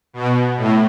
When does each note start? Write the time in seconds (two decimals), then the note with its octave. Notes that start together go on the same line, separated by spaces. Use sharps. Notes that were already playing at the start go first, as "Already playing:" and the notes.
0.13 B2
0.57 A2